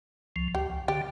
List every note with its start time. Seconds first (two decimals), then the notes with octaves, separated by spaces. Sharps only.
0.36 C#2 F3
0.55 D2 G4
0.70 C#2
0.88 D3 G4